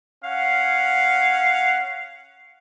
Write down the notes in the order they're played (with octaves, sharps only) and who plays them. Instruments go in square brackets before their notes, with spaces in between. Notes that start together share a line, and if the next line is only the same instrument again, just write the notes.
[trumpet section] C#4 F5 F#5